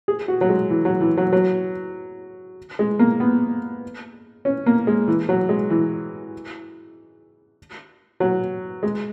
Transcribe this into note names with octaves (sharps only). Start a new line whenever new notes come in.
G#4
F#4
F#3
G#3
E3
F#3
E3
F#3
F#3
G#3
A#3
B3
C#4
A#3
G#3
E3
F#3
G#3
E3
F#3
G#3